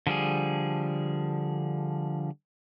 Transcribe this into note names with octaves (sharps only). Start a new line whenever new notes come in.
D3 F3 G3 G#4